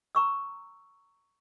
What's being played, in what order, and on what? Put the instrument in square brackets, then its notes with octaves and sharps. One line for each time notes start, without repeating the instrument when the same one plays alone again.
[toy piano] A#5 C#6 E6